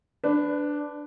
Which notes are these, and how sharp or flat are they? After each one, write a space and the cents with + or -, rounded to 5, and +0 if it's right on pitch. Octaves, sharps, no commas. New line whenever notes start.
D4 +0 B4 +20